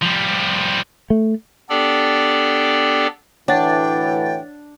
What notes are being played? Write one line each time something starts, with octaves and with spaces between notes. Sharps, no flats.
F3 G3
A3
B3 D4 G4 A4 D5 G5
D2 A2 E3 D4 C#5 F#5 G5 A6